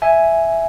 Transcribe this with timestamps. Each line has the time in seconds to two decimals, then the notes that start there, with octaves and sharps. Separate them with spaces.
0.02 E5 G#5